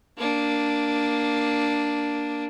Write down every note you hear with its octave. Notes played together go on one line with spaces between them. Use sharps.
A#3 D4